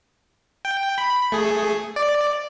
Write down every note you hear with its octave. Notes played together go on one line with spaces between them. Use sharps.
G5
B5
A3 G#4
D5